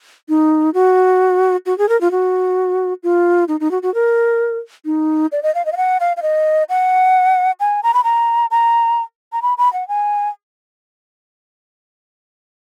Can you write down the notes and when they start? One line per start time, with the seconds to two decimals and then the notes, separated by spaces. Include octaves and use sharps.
0.29 D#4
0.74 F#4
1.66 F#4
1.78 G#4
1.89 A#4
2.01 F4
2.11 F#4
3.03 F4
3.48 D#4
3.60 D#4
3.71 F#4
3.82 F#4
3.94 A#4
4.85 D#4
5.32 D5
5.43 D#5
5.55 F5
5.65 D#5
5.72 F5
5.77 F#5
6.00 F5
6.17 F5
6.22 D#5
6.69 F#5
7.60 G#5
7.83 A#5
7.94 B5
8.04 A#5
8.51 A#5
9.33 A#5
9.42 B5
9.58 B5
9.73 F#5
9.88 G#5